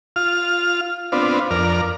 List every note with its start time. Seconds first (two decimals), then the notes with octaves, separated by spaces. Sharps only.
0.16 F4 F6
1.12 B3 C4 D4 F4
1.51 F2 A#4 D5 F6